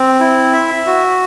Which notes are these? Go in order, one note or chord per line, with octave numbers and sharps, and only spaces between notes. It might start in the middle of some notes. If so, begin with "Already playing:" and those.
Already playing: C4
E4
E5
F#4